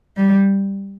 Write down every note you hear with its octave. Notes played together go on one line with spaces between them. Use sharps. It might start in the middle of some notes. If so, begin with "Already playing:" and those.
G3